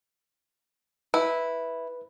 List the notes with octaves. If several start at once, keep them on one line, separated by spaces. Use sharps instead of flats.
E4 B4